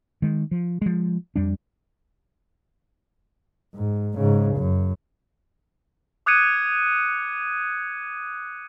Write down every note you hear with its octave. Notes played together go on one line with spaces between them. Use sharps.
D#3 G#3
F3
F3 G#3
F2 G3 D4
G#2
G#2 C#3
F#2
D6 D#6 F#6 G#6 C#7 D#7